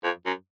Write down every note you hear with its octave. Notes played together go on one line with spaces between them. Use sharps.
F2
F#2